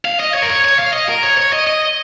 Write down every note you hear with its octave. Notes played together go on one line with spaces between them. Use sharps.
F5
D#5
C#5
A#4
C#5
C#5
F5
D#5
A#4
C#5
C#5
D#5
D#5